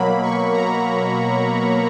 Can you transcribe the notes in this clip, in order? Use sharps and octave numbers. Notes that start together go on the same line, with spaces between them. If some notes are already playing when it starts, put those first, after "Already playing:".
Already playing: B2 F#3 A#3 B5
C#6
A#5